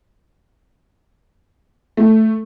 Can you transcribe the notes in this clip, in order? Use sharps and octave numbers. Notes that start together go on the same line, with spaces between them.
A3